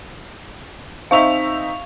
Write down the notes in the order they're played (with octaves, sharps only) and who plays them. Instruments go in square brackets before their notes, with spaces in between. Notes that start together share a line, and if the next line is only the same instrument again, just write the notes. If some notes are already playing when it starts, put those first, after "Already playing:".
[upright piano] C4 D#4 E5 [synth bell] F5 C#6 F7